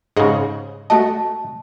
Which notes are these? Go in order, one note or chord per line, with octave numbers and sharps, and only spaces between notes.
G#2 C#3 G#4 D#5 F#5
A3 F#4 D#5 A5